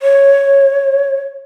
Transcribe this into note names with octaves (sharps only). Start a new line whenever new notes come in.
C#5